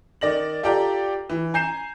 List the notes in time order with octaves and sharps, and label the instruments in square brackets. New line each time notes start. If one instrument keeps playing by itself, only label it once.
[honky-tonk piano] D#3 D5 A#6 F#7
F4 G4 A4 D5 G5 A#5
E3
G#5 A#5 G6 C7 E7